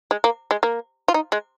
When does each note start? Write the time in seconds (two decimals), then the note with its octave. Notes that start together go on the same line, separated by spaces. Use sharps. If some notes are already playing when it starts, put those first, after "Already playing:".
0.11 G#3
0.24 A#3
0.51 G#3
0.63 A#3
1.08 F4
1.14 D#4
1.32 G#3